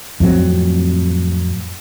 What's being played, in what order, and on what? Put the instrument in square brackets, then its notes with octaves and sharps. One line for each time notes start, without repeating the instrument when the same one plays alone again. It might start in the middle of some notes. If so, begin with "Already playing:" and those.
[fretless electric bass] F2 A2 F#3 C4